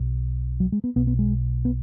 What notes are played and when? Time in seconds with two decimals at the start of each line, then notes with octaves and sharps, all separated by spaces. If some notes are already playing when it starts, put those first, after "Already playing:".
Already playing: B1 B2
0.60 F#3
0.72 G#3
0.84 B3
0.96 B1 B2 B3
1.07 B3
1.19 G#3
1.65 B3